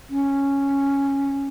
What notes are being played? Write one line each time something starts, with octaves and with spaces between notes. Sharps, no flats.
C#4